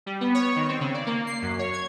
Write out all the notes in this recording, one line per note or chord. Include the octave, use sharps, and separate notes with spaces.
G3
B3
C#5
D#3
C4
C#3
D5
A#3
C7
F#2
C#5
G#6